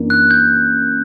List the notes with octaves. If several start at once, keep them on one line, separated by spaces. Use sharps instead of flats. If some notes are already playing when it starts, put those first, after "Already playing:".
Already playing: F#2 E3 A#3 D4
F#6
G6